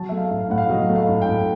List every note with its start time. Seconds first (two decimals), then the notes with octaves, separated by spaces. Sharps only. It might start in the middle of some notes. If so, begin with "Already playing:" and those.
Already playing: F#3 A5
0.09 A3 E5
0.17 F5
0.31 A2
0.44 F5
0.50 A2 F#5
0.58 F5
0.69 F#3 D#5
0.89 A3
0.96 F5
1.09 A2
1.22 G5
1.28 A2